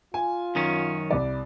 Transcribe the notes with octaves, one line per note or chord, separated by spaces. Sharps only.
F4 G#5
F#2 D#3 C#4
C2 D5